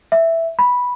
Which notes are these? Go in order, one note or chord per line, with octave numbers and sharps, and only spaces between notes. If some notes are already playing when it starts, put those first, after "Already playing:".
E5
B5